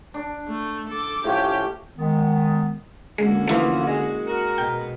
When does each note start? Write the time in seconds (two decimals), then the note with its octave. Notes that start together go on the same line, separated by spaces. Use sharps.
0.14 D4
0.48 A3
0.89 A4 D6
1.24 A2 F3 C#4 G4
1.98 D#3 G#3 B3
3.18 D3 G#3 A#3 C#4 F#4
3.48 E3 F3 A3 E4 F4 B4
3.87 G#3
4.26 F#4 A#4
4.58 B2 G5